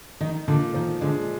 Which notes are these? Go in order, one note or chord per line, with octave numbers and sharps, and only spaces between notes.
D#3 D#4
A#2 D3
D#3 F3
D3 G#3